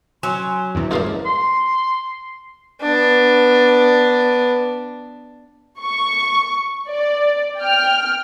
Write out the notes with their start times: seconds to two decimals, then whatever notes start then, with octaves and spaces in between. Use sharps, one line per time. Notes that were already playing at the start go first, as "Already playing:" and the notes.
0.23 F#3 C#4 C6
0.75 E2 G2 C3 E4
0.91 C#2 F3 A#3 C5 D5 F5
1.25 C6
2.81 B3 D4
5.78 C#6
6.88 D5
7.58 G5 F6